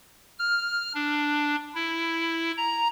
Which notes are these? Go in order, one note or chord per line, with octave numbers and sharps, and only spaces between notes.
F6
D4
E4
A#5